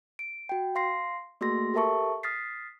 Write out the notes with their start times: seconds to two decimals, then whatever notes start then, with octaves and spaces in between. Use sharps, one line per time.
0.19 D7
0.49 F#4 G5
0.75 F5 C6 A#6 C7
1.41 A3 A#3 F#4 G#4 C6 A#6
1.74 G4 A4 A#4 E5 A5 C#6
2.23 D#6 F6 A6 B6 C7